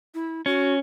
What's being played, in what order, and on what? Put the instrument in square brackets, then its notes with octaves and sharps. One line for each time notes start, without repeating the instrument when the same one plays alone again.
[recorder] E4
[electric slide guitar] C#4 [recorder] F#4